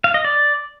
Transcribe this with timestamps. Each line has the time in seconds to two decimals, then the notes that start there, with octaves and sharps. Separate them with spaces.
0.04 F5
0.14 D#5
0.24 D5